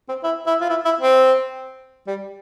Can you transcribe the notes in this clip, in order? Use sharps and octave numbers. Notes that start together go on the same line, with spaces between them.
C4
E4
E4
F4
E4
E4
C4
G3